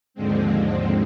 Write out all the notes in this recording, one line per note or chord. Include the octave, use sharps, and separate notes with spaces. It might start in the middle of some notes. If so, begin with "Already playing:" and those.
D#2 G#2 D3 F3 G#3 C4